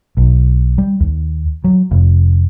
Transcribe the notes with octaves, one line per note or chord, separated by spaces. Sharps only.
B1
G3
D#2
F#3
F1